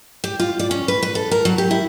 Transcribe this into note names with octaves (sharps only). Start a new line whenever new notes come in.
G4
F4
D5
C#4
B4
B4
A4
A#4
F#3
G4
E4